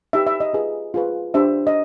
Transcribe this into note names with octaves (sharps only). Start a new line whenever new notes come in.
D#4 G4 B4 E5
E5
D#5
F4 G#4 B4
F4 G#4 B4
D4 G4 C5 E5
D#5